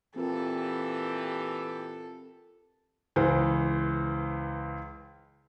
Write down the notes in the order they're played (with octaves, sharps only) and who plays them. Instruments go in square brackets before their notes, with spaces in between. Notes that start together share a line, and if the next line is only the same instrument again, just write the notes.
[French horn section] A#2 E3 G4 [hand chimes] C4 F4 A#4 [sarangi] A4
[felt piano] C#2 E3 C5